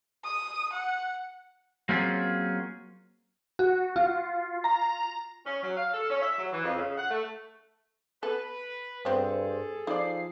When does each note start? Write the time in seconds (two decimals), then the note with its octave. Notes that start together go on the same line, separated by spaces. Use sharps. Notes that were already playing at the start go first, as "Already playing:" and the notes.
0.24 D#6
0.73 F#5
1.89 F#3 A#3 C4 C#4 F4 G#4
3.59 F#4
3.96 F4
4.64 A#5
5.46 C#4
5.63 F#3
5.77 F5
5.93 A4
6.10 C#4
6.22 E5
6.38 F#3
6.53 E3
6.64 F2
6.78 C#3
6.98 F#5
7.10 A3
8.23 A4 B4
9.05 G2 B3 C4 G#4 A4 C5
9.87 F3 D#4 D5 C7